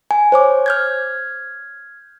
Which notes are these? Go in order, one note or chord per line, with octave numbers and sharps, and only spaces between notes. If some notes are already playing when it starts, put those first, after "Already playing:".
G#5
C5 C#5 D6
F6 G6 G#6